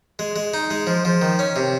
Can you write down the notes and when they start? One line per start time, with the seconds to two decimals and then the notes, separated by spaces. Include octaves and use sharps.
0.19 G#3
0.36 G#3
0.54 D#4
0.71 G#3
0.87 F3
1.05 F3
1.22 D#3
1.39 C#4
1.56 C3